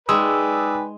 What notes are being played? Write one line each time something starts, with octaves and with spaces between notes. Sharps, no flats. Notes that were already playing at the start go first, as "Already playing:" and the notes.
G#3 D#4 B4 D5 G5 G#5 D#6 E6